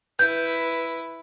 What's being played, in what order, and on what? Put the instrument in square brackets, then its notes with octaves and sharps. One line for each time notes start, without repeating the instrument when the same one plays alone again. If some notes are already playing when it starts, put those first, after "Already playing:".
[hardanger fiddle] E4 B4 [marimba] G6